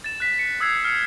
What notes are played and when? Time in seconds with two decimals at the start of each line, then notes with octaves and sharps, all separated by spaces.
0.04 A6 E7
0.20 F#6 B6
0.39 C#7
0.60 D#6 E6 G#6 C7
0.84 F6 C7 C#7